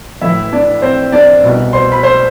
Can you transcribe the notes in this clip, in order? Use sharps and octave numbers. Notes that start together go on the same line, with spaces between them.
A1 A2 E3 E4 E5
D4 D5
C4 C5
D4 D5
C2 B2
C5 C6
B5
C5 C6